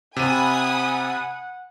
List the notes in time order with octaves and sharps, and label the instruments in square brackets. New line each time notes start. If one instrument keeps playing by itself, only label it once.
[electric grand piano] C3 D#7 [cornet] F#5 [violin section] G#5 B5 D#6